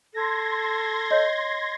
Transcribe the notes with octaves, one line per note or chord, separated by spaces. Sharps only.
A4 C6 G#6 A#6
C#5 D#5